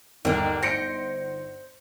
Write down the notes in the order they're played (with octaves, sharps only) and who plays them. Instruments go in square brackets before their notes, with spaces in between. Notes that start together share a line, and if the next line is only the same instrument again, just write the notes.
[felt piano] G1 [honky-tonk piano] D#2 [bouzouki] D3 A#3 [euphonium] D#4
[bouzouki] C5 [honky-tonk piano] A#6 C#7 D7